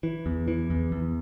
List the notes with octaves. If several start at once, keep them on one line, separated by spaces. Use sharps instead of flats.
E3
E2
E3
E2
E2